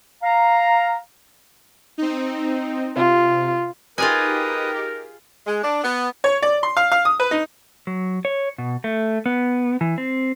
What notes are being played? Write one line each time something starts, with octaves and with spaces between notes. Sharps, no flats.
F5 A#5
C4 D#4
C3 F4
D#4 F4 G4 G#4 A#4 B4 G#5 D#6
G#3
D4
B3
C#5
D5
C6
F5
F5
D#6
B4
D#4
F#3
C#5
B2
A3
B3
E3
C4